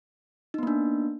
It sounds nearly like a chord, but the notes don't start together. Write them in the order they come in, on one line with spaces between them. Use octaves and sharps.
D#4 B3 A#3 D4